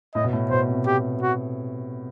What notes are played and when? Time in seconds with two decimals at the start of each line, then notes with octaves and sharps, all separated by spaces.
0.15 A2 D#5
0.24 B2
0.33 A2
0.50 B2 C5
0.69 C3
0.86 G4
1.22 F#4